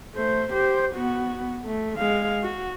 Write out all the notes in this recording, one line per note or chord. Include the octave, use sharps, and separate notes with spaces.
A3 C5
G4 C5
B3 F#4
A3
G#3 F5
F#4